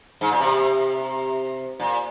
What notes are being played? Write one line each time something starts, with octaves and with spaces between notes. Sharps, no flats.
G#2
A#2
C3
A#2